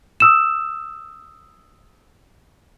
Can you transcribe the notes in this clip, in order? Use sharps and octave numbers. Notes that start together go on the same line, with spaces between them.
D#6 E6 E7